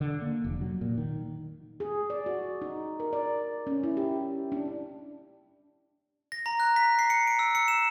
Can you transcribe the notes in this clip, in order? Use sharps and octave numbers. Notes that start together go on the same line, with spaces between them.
D3
A#3
F1
F#3
A#2
D#3
G#4
D5
F#4
D#4
A#4
D5
C#4
E4
G4
D4
A#6
A#5
F#6
B6
C7
C#7
D7
E6
C#7
E7